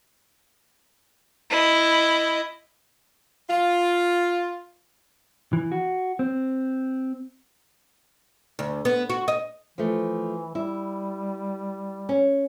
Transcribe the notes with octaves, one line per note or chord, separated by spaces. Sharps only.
E4 D#5
F4
E3
F#4
C4
D2
B3
F#4
D#5
E3 F3 A3
G3 E4
C#4